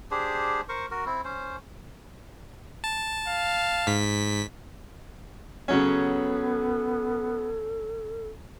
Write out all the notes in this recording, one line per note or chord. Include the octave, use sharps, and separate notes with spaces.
D4 G4 G#4 C5
A#4 C5 C#6
F#4 A#4
C4 E4
C#4 C5
A5
F5
G#2 B6
C#3 F#3 B3 C#4 A4